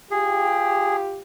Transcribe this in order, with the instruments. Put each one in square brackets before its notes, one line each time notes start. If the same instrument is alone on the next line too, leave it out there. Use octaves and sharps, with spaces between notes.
[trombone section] F4 G4 [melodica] G#4